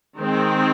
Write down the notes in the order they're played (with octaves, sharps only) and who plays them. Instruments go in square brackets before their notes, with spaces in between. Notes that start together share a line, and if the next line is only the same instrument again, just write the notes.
[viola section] D#3 G#3 C4